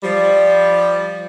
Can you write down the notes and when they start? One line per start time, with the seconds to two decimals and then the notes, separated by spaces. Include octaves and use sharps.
0.03 F3 G3